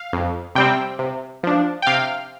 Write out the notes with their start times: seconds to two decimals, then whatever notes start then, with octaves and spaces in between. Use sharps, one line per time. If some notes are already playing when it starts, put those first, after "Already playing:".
Already playing: F5
0.13 F2
0.55 C3 G3 C4 G5
0.99 C3
1.43 F3 D4
1.82 G5
1.86 C3 F5